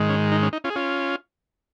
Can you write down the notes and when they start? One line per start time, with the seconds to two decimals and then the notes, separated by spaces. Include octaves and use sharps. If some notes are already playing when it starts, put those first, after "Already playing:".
Already playing: G#2 D#3 G#3
0.09 C#4
0.32 D#4
0.42 C#4
0.53 D#4
0.64 C#4 F4
0.70 G#4
0.76 C#4 F4